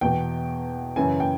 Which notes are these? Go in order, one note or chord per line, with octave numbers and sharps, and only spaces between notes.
E2 B2 G5
F#2 C#3 E3 G#5
G5